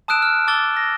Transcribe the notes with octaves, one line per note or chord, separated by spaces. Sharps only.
A5 D#6 E6 F#6 D7 E7
F6
A5 D6 E6 A6 G7
A#6